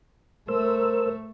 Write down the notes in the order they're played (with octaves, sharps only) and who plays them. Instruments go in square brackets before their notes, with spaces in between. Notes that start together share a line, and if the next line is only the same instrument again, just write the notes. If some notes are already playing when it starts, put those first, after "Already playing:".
[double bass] A3 [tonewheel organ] A#4 C5 E6